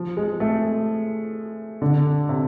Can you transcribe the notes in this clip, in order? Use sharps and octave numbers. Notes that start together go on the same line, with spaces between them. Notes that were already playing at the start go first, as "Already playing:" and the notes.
Already playing: F3
G#3
A3
D3
C3